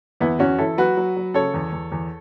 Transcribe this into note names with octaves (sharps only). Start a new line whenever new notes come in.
E2 B3 E4
E2 C#4 F#4
E2 E4 A4
F#3 F#4 B4
F#3
F#3
C#3 A4 C#5
E2
E2
E2